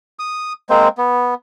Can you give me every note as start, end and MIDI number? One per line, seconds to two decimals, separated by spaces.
0.19 0.53 87
0.70 0.88 56
0.70 0.88 58
0.70 0.88 60
0.70 0.88 72
0.98 1.34 59